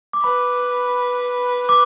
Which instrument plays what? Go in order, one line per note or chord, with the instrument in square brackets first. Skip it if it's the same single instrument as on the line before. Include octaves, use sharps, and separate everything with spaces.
[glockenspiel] D6
[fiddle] B4 [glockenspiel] B5
[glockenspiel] D6